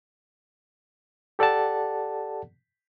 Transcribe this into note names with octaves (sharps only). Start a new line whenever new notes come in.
G4 A4 D5 F#5 A5